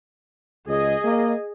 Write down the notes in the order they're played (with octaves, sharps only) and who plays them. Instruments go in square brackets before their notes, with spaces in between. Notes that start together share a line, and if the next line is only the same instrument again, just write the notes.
[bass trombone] C#2 [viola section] G#4 D#5
[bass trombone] A#3